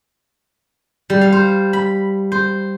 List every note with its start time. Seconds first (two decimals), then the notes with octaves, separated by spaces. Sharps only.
1.10 G3
1.21 F5
1.32 C5
1.73 B5
2.32 C5